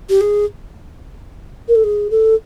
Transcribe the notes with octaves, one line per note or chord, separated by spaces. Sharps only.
G4
G#4
A#4
A4
G#4
A4